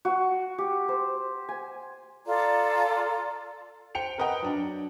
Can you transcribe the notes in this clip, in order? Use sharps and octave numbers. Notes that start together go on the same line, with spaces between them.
F#4
G4
C5
G#5
F4 A4 D5 A#5
C5 G5 C#7 F7
A#4 B4 D#5 F#5 G5
F#3 D4